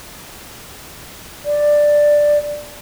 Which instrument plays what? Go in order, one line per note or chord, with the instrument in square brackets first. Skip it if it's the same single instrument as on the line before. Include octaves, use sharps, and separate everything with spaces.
[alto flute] D5